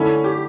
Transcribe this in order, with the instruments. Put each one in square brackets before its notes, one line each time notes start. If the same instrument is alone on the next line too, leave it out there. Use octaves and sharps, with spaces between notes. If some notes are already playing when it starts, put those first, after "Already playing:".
Already playing: [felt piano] D3 A3 E4 [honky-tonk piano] C#4
[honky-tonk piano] G4